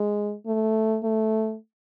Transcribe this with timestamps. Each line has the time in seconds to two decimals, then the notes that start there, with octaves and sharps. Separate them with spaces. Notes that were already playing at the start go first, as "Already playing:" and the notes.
Already playing: G#3
0.47 A3
1.04 A3